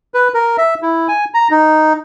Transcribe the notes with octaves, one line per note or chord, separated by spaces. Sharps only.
B4
A#4
E5
E4
G#5
A#5
D#4